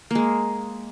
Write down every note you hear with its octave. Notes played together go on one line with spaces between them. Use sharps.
G#3 A#3